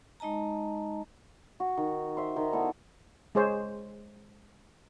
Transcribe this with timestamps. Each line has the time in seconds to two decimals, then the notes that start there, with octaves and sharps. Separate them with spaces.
0.20 G#3 D#4 D#5 A5 A#5
1.60 F#4
1.77 D#3
2.17 C5 E5
2.36 D#3 A#4 C5
2.52 B3 E4 A4 D5
3.35 G#3 G#4 C5 C#5